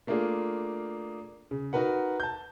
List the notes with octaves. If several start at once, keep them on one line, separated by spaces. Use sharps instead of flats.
A3 A#3 D4 F4 G#4
C#3
D#4 F#4 A#4 B4 F#5
A5 G6